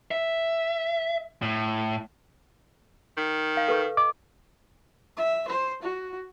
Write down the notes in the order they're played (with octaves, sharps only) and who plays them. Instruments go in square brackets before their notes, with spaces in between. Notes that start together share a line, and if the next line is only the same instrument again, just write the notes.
[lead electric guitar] E5
A2
[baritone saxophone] D#3
[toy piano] F5
A4 B4 C#6
[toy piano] D#5 [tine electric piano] D6
[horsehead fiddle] E5
C5
F#4